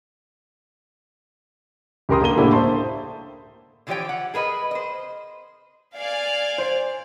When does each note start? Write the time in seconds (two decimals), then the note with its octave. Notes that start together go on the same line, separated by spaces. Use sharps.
2.09 C#2 G4 A#4 C6 D#6
2.21 D3 A#3 A#5 D#7 G7
2.37 A2 D3 A#3 D4 E4 G4
2.52 C5 E5 A5 C6 C#6
3.87 D3 E3 F3 G4 C#5 G5
4.09 F#5
4.34 G#4 A#4 B4 D#5
4.71 C5 D#5
5.96 D5 F5 G#5
6.58 C5